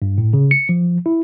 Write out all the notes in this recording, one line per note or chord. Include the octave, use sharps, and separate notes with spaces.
G2
A2
C#3
C#7
F3
E4